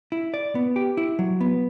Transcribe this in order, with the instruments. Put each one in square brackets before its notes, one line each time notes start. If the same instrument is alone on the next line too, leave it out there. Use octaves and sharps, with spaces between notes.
[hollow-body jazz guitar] E4
D5
B3
G4
E4
F#3
B3